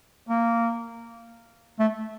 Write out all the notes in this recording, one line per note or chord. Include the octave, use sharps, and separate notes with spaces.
A#3
A3